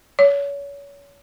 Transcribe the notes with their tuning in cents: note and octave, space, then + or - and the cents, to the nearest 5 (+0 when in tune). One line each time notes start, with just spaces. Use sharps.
C#5 +30